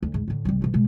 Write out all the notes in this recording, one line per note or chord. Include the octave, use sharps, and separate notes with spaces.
D2
G#2
A2 D3
C2 G3
B2 G3
B2 G#3